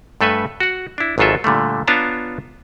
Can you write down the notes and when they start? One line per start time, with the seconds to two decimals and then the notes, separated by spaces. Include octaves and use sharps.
0.21 G2 A3 A4 B4 G#5
0.60 F#4 F#5
0.98 D4 E4
1.18 G#1 G#2 F#3 F4 A4 E5
1.44 A#2 D3 G3 A3
1.87 B3 D4 F4 C#5 A5 A#5